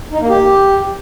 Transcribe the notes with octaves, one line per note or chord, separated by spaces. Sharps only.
D#4
A#3
G4